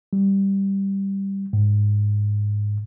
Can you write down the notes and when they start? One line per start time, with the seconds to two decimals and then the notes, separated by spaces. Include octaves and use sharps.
0.13 G3
1.53 G#2